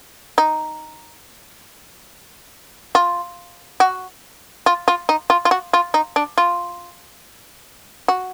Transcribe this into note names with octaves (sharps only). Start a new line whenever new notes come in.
D#4
F4
F#4
F4
F4
D#4
F4
F4
F#4
F4
D#4
D4
F4
F#4